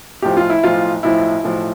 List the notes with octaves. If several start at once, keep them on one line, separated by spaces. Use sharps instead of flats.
B1 A2 F3 G4
F4
E4
B1 A2 F3 F4
B1 A2 F3 E4
B1 A2 F3